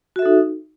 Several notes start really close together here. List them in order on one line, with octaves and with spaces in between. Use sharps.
F#4 E5 A4 D#4